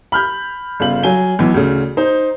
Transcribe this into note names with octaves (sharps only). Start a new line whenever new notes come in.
B5 F6 G6
G1 C#3 F4 F#7
F#3 G#5 G7
B1 E3
D2 C#3
D#4 C5